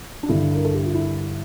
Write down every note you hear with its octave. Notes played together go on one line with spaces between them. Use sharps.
D4
G2 D3 G3 E4
A#4
A4
G4
F4
E4